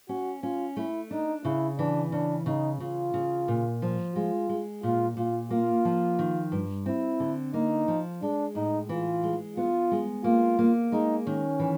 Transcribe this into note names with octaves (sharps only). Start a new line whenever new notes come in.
C#4 F#4
C#4 F4
A3 E4
D4 D#4
C#3 E4
E3 D4
C#3 D4
C#3 D#4
C#3 F4
C#3
A#2
F3
G#3 F4
G#3
A#2 F4
A#2 F4
A#3 F4
F3
D#3
G2
C4 E4
D3
A#3 D#4
F3
G#3 D4
A2 D#4
E3 F4
G#3
B3 F4
G#3
A#3 F4
A#3
G#3 D#4
D#3 C#4
E3